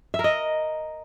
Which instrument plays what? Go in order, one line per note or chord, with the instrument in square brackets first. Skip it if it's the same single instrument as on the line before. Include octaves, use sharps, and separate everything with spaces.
[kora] E5
A#4
D#5